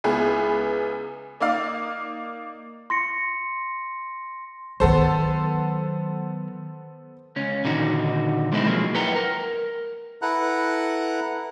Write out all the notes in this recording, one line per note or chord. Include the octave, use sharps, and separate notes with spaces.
C#2 B3 E4 G#4 B4
A#3 D#4 D5 F5
C6 A#6 C#7
D#3 F#3 B3 A4 C5
C#2 C#4
A#2 D3 D#3 D#4 F#4
B2 G#3 A3 C4 D#4 E4
F3 F#3 G#3 A#3
F#2 E4 B4 F#5 G5 A#5
A#4
E4 A4 B4 F#5 A#5 F#6